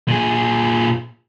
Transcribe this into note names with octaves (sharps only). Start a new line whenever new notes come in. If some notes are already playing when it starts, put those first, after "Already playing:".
A#2 G#4